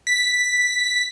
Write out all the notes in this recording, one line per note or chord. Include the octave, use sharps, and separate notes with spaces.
B6